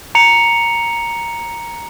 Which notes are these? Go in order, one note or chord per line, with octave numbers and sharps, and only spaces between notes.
A#5 C#7 F7